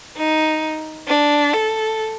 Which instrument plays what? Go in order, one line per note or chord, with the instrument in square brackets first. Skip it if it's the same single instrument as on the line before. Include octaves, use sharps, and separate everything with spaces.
[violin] D#4
D4
A4